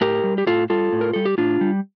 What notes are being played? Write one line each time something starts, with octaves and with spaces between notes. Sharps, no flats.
A2 G4 A#4
G3
G4
A2 F4 A4
G3 F4 A4
A2
A#4
G3 A4
G4
A2 D4 F4
G3